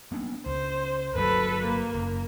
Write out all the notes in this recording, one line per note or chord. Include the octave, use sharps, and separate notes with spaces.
A#3 B3 D4
C#2 C5
G1 C#3 F#3 A4 B4
A#3
F#1